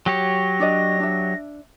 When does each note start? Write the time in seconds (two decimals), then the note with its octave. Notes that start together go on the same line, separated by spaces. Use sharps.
0.06 F#3 G4 C#5 A#6
0.60 D4 D5 D#5
1.00 D4 E5